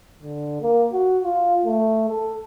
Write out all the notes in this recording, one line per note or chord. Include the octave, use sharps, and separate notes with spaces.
D3
A#3
F#4
F4
A3
A4